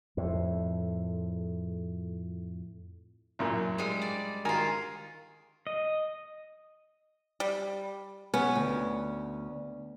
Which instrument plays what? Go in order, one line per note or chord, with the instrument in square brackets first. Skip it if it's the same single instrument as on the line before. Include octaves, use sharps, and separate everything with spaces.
[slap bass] F2 A2
[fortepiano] A1 F#2 A#2
[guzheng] G3 G#3
D5
[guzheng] D#3 F4 [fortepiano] A#4 G#5 A#5
[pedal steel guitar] D#5
[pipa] G3
[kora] B3 [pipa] C#4
[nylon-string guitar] D2